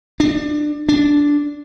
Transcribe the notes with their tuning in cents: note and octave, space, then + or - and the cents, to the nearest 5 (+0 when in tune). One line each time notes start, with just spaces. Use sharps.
D4 +20
D4 -10